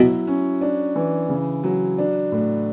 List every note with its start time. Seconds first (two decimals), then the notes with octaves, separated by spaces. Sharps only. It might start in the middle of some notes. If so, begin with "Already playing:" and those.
Already playing: B2 F#3 E4
0.27 C#4
0.61 D4
0.96 E3
1.29 C#3
1.64 F#3
1.98 D4
2.32 A2